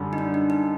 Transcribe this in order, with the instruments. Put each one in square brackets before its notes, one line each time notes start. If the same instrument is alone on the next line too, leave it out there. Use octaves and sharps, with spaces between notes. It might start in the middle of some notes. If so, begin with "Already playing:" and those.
Already playing: [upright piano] F#2 D3 G3
[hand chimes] D#4
D4
D#4
D#4